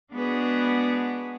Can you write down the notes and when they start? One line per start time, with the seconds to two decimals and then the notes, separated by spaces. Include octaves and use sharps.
0.13 G#3 B3 D4 F#4 G#4 B4